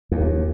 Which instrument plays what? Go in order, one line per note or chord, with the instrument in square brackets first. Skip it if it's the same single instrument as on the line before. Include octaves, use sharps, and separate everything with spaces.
[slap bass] D#2